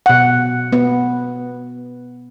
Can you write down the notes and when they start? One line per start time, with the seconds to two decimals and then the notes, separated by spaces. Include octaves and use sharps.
0.06 B2 F#5
0.73 B3